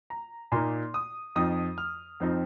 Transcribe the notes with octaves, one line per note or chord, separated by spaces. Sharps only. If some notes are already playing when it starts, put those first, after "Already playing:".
A#5
A#2 A#3 D#4 C6
D#6
F2 F3 D#4 D#6
F6
F2 F3 C4 D#4